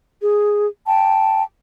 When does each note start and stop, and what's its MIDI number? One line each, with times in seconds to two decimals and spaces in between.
0.20 0.66 68
0.86 1.43 79
0.86 1.43 81